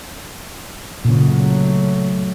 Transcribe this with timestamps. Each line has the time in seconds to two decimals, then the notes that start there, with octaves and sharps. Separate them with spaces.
1.05 A#2 C#3 F#3 A3